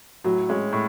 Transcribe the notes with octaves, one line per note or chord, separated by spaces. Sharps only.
A2 F#3
G#3 C#4
A2